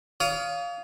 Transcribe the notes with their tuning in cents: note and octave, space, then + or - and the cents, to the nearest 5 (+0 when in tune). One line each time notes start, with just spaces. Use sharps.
C#5 +45 F5 +0 D#6 +0